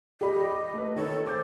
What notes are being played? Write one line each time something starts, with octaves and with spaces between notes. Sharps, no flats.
G4 D5 D#5 B5
D6
A3 B4
D#3 A4 C#5
C5 D6 G6 A6